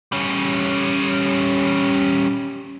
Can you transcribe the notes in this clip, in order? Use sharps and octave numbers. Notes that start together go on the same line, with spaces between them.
G3 C#4